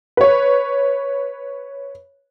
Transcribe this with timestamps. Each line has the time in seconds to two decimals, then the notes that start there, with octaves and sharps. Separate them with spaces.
0.17 B4 C#5